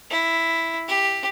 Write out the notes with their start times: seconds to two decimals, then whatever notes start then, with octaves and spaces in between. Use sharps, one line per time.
0.11 E4
0.88 G4